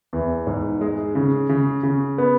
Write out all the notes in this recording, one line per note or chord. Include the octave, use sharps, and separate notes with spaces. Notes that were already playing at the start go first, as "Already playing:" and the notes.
E2
G#2
G#3
C#3
C#3
C#3
B3